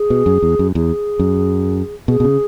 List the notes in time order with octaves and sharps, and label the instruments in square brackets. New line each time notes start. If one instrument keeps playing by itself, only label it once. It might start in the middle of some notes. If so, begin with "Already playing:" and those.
Already playing: [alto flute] G#4
[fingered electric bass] B2
F#2
E2
F#2
[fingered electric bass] E2 [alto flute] G#4
[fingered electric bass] F#2
[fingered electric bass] B2 [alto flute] G#4
[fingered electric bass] B2
C#3